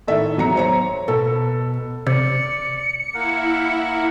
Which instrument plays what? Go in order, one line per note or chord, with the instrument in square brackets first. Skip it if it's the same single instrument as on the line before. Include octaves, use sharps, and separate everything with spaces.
[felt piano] A2 D#3 A4 E5
E1 F#3 A#5 C#7
C5 C#5 A#5
[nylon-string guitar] B2 [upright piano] A4
[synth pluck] C3 [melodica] D5 [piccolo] C#7
[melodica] A#3 A#4 F#5 [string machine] E4